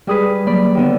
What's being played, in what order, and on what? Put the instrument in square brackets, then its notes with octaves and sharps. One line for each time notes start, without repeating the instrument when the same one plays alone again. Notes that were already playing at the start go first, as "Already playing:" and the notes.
[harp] G3 G#4 B4 [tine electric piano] G#3 D5 D#6
[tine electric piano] F#3 A#3 [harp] D5 B5
[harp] D#2 D3 B3